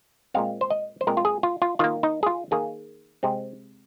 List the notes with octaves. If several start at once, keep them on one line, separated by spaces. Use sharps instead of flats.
A#2 G#3 C4 F5
C5
D#5
C5
A#2 G#3 C4 A#4
F4
G#4
F4
F4
D#3 A#3 F4
D#4
G#4
F4
D#3 A#3 G#4
C3 G#3 C4